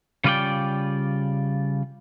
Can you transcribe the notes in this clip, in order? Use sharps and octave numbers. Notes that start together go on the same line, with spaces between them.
C#3 G3 F4 B4 D5 G5